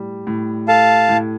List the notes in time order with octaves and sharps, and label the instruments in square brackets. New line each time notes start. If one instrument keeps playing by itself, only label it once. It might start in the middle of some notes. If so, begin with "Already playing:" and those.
Already playing: [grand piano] A2 G3
A2
[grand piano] A4 [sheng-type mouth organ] F5 A5
[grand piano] A2